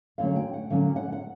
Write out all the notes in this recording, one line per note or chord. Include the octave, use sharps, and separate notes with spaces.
F#2 D3 F#3 A3 C#4 F5
G5
F#5
F#2 D3 F#3 C#4 F5
F#5
F#5